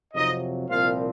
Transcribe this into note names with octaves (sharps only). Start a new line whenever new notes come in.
F2 C3 F#3 D#4 D#5
C2 A#2 F3 C4 F4 F5